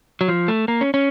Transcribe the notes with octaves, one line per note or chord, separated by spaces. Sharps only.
F#3
F3
A3
A#3
C#4
C#4